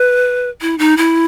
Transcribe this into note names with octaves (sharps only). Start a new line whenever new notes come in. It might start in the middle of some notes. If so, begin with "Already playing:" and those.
Already playing: B4
E4
D#4
E4